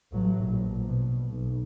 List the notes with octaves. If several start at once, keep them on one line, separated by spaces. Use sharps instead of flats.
A1 F#3
A#1
B2
B1